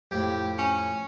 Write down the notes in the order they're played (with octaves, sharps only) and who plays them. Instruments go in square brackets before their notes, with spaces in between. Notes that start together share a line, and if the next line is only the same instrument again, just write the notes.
[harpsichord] F2 A2 [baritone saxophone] G4
[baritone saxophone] C#4